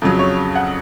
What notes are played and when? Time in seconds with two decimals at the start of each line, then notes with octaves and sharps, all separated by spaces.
0.02 F2 C#3 F#3
0.19 C#5
0.55 F#5